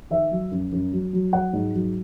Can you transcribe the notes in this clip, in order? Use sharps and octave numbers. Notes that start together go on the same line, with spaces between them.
D#3 E5
F#3
F#2
F#2
F#3
F#3
F#3 F#5
G#2
F#3